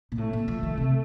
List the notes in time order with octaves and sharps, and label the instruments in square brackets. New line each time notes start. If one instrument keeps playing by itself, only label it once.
[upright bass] A#2
[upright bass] A2 [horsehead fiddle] A3
[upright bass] A#2
F3
D#3
C3